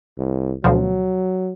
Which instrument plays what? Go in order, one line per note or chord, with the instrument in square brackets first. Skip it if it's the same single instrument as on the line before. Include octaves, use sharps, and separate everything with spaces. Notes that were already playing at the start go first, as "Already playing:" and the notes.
[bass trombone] C2
[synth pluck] D2 B2 F3 [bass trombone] F#3